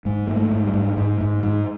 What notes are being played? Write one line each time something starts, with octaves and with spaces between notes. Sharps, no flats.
G#2 G#3
G#2 A#3
A3
G#2
G3
G#2
G#2 G#3
G#2
G#2 G#3